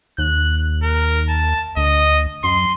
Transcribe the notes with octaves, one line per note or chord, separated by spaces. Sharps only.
D#2 F#6
A#4
A5
D2 D#5
F#2 C6